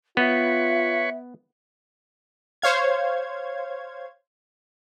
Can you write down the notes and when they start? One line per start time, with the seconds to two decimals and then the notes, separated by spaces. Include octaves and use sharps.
0.17 B3 F4 B4 C#5 E5
2.62 C5 C#5 F5 G#6